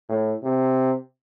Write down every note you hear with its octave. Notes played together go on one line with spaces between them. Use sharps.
A2
C3